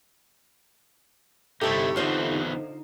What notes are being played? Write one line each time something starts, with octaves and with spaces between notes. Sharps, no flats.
G1 C3 A3 C4 D#4 E4 G4 A4
E2 D3 B3 C4 D#4 F4 C5 D#5